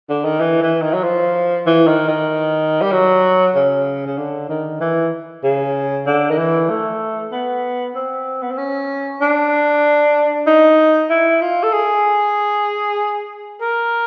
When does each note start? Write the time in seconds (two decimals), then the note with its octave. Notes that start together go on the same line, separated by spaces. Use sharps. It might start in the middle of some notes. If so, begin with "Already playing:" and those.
0.10 D3
0.25 D#3
0.41 E3
0.62 E3
0.82 D#3
0.94 F#3
1.04 F3
1.67 E3
1.87 D#3
2.08 D#3
2.82 G3
2.92 F#3
3.55 C#3
4.06 C#3
4.18 D3
4.49 D#3
4.81 E3
5.44 C#3
6.07 D3
6.30 D#3
6.38 E3
6.70 A3
7.32 B3
7.95 C4
8.42 B3
8.51 C4
8.58 C#4
9.22 D4
10.47 D#4
11.10 E4
11.41 F4
11.63 A4
11.73 G#4
13.61 A#4